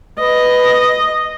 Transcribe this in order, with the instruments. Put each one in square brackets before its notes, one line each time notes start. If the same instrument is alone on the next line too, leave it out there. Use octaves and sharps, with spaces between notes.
[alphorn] B4 [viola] D#5